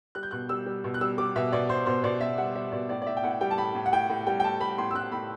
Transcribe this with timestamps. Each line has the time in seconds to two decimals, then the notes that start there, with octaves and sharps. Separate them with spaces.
0.15 G3 F#6
0.23 G6
0.31 B2 F#6
0.49 G3 E6
0.66 G3
0.84 B2
0.94 F#6
1.01 G3 E6
1.18 G3 D6
1.36 B2 E5
1.52 B2 D5
1.69 B2 C5
1.86 B2 C5
2.04 B2 D5
2.21 B2 E5
2.38 G3 F#5
2.55 G3 E5
2.72 B2 D5
2.89 A2 D5
3.02 D5
3.06 A2 E5
3.17 G5
3.24 A2 F#5
3.41 G3 G5
3.51 A5
3.57 A2 B5
3.75 A2
3.86 F#5
3.93 A2 G5
4.10 A2
4.27 G3 G5
4.40 G5
4.44 A2 A5
4.60 G3 B5
4.78 A2 C6
4.91 E6
4.95 A2 F#6
5.12 A2 B5